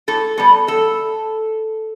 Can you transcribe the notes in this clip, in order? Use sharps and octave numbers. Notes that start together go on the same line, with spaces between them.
A2 A4
G3 B3 A4
E2 A4